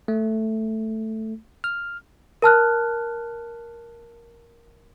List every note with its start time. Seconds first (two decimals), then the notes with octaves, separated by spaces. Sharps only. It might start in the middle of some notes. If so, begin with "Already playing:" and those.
0.08 A3
1.64 F6
2.42 A#4 A5 F6 F#6